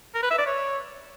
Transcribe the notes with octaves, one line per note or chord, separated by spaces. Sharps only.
A#4
B4
E5
D5
C#5